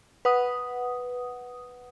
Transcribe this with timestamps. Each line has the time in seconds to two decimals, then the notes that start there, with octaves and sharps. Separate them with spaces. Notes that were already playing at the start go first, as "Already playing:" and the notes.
0.25 B4 F#5 D#6